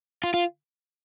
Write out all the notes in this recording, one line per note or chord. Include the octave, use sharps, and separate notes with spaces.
F4
F4